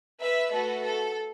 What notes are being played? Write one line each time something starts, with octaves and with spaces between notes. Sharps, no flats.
B4 E5
A3 F#4 A4 B4
A4